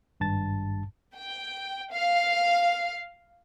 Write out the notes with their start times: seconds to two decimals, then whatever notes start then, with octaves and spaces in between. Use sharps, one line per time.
0.20 G#1 G2 A5 A6
1.15 G5
1.92 F5